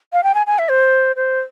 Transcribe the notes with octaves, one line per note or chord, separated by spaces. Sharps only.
F5
G5
G#5
G#5
E5
C5
C5